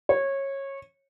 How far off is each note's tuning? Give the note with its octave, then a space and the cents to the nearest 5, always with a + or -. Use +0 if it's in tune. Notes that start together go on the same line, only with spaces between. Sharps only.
C#5 -20